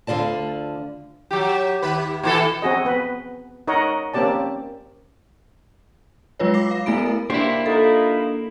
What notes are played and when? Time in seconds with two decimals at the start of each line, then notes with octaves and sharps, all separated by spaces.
0.07 D2 D3 F4 D5 A5
1.31 F#3 G4
1.82 D#2 B4
2.23 A#2 E3 A4
2.62 C4 F#4 G#4 D#5
2.85 B3 B4
3.68 D#4 A#4 C#5 D#5 F#5
4.14 A#3 C4 C#4 G4 D5 A5
6.39 F#3 G#3 F4 B4 C#5
6.54 D6 A#6 C7
6.71 F5
6.86 A3 B3 E4 B5 D7
6.98 A#4
7.30 A#3 D4 E4 G4 C5
7.66 D#4 F4 A4 B5